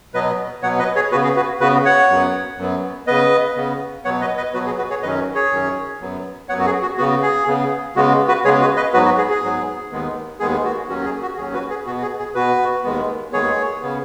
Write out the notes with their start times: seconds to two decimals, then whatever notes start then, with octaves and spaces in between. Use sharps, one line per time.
0.14 B2 F#3 B3 B4 D#5
0.62 B2 F#3 B3 C#5 F#5
0.79 B4 D#5
0.95 G#4 C#5
1.12 C#3 B3 F#4 B4
1.24 G#4
1.36 F#4 B4
1.61 C#3 B3 F#4 B4
1.85 C#5 F#5
2.09 F#2 F#3 B3
2.58 F#2 F#3 B3
3.07 C#3 B3 B4 D#5
3.56 C#3 B3
4.04 B2 F#3 B3 C#5 F#5
4.21 B4 D#5
4.37 B4 D#5
4.54 B2 F#3 B3 F#4 B4
4.66 G#4
4.78 F#4 B4
4.90 G#4 C#5
5.03 F#2 D#3 F#3 C#4 B4 D#5
5.35 G#4 C#5
5.52 F#2 D#3 F#3 C#4
6.01 F#2 F#3 B3
6.49 F#2 F#3 B3 C#5 F#5
6.59 F#4
6.66 G#4
6.82 F#4
6.98 C#3 B3 F#4
7.22 G#4
7.47 C#3 B3
7.96 C#3 G#3 B3 F#4
8.28 F#4 B4
8.45 C#3 G#3 B3 G#4 C#5
8.61 F#4 B4
8.77 B4 D#5
8.93 G#2 F#3 B3 F#4 B4
9.05 F#4
9.18 G#4
9.30 G#4
9.42 G#2 F#3 B3
9.91 D#2 D#3 G#3 B3
10.40 D#2 D#3 G#3 B3 G#4
10.65 F#4
10.89 D#2 D#3 F#3 C#4 F#4
11.05 G#4
11.22 F#4
11.37 D#2 D#3 F#3 C#4 G#4
11.54 F#4 B4
11.70 G#4
11.86 B2 B3 F#4
12.02 G#4
12.19 G#4
12.35 B2 B3 F#4 B4
12.84 D#2 D#3 G#3 B3
13.33 D#2 D#3 G#3 B3 G#4 C#5
13.81 C#3 B3